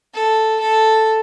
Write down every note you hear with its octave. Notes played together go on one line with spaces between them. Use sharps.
A4
A4